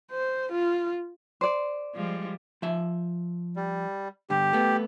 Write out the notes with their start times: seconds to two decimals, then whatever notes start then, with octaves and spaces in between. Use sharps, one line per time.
0.11 C5
0.52 F4
1.41 C5 D5
1.95 F3 G3 G#3
2.62 F3 E5
3.56 G3
4.30 G2 D3 G4
4.53 A3 B3